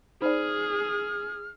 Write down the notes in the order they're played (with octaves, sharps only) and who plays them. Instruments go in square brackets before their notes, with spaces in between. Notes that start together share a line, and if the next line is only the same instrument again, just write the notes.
[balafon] D#4 [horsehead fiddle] G#4 [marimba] C5 D5 [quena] F6